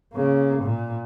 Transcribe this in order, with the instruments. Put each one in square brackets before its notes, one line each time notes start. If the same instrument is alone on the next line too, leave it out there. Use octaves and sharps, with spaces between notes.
[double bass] C#3 A#3
A#2